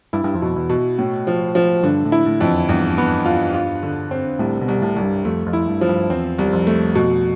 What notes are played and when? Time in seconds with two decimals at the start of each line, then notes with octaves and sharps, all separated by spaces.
0.13 G2 E4
0.24 G2
0.34 F2
0.42 B2
0.56 E2
0.69 B2
0.99 A2
1.27 F3
1.55 F3
1.83 G2 D3
2.05 A2
2.12 E4
2.26 A2
2.41 F2
2.47 E2
2.69 E2 G2
2.98 B3
3.26 F4
3.54 F4
3.83 D3
4.11 C4
4.39 C2 A2
4.61 B2
4.68 C2
4.82 A2
4.96 C2
5.03 G2
5.25 F2 A3
5.46 F2
5.53 E4
5.68 G2
5.81 F3
5.89 G2
6.10 E2 C4
6.38 C2
6.53 F2
6.67 A3
6.95 B2